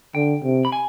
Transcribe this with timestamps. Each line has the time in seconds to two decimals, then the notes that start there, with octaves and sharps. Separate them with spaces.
0.15 D3 G5
0.44 C3
0.65 B5
0.72 G#5